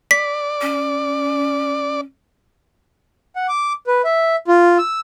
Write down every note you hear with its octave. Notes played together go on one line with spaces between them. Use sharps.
D5 B6
C#4
F#5
D6
B4
E5
F4
E6